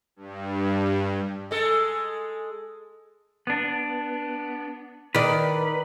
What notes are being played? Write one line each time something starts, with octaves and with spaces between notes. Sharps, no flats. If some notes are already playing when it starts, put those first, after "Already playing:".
G2
G#3 A4
B3 D4
D#3 B4 D5